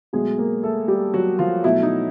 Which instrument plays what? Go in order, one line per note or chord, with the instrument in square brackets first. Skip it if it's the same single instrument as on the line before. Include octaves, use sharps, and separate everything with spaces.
[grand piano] B2 F#3 G#3 A3 G#4
A#3 A#4
A3 A4
G3 G4
F#3 F#4
F3 F4
B2 F#3 A3 E4
D#4